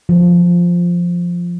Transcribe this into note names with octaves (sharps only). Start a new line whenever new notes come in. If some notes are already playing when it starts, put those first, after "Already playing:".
F3